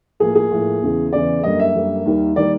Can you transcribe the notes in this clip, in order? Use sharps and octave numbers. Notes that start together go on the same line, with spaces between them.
A2 F3 A#3 G#4
G#4
A2 F3 A#3
E2 C#3 E3
E2 C#3 E3 D5
F#2 D3 G3 A#3 D#5
E5
F#2 D3 G3 A#3
D#2 D#3 G3 A#3
D#3 G3 A#3 D5